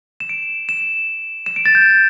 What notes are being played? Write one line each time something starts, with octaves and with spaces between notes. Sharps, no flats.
E7
D7
E7
E7
D7
A6
G6